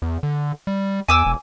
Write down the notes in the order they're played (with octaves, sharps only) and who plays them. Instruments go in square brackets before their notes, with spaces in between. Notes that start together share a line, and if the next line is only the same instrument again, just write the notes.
[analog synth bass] E2
D3
G3
[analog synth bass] E2 [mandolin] G#5 D6 E6
[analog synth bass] E1